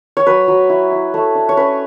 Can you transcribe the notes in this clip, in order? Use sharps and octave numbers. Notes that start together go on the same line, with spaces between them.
C#5
F#3 B4
F#3
E4
E4
A3
D4
C#5
C#4 B4